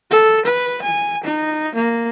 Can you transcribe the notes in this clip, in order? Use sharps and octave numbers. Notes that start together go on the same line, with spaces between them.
A4
B4
G#5
D#4
A#3